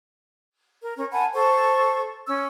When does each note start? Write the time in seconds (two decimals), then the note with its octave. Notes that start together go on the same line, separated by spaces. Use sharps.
0.81 A#4
0.96 C#4 A#4
1.10 F#5 G#5 A5 B5
1.33 A4 C5 C#6
2.26 C#4 E6